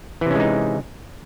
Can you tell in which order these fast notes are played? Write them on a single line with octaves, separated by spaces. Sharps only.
E3 C3 C#4 G#3 D#4